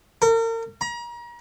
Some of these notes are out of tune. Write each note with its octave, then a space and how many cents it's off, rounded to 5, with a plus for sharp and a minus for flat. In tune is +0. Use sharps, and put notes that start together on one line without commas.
A#4 -40
A#5 +35